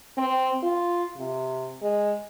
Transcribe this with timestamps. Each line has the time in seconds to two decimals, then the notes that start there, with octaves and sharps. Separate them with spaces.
0.17 C4
0.63 F4
1.17 C3
1.82 G#3